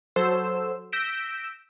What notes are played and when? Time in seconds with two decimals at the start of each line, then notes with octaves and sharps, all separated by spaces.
0.16 F#3 A4 C5 E6
0.92 E6 G6 A#6 B6 D7 E7